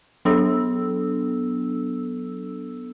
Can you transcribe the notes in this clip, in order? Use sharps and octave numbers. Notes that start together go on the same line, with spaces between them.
F#3 B3 D4 A4 E6